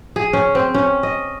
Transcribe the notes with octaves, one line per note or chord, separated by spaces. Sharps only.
G#4
C#4
C4
C#4
D#5